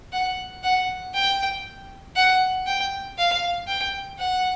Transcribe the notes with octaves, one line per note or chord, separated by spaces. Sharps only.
F#5
F#5
G5
F#5
G5
F5
G5
F#5